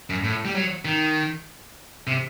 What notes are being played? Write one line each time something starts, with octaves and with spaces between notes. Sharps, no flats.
F#2
A2
G3
F#3
D#3
C3